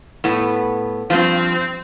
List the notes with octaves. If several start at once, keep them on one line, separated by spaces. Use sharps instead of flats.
A2 B3
G2 F3 C4